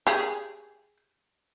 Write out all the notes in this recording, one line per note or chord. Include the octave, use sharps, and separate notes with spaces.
G4 G#4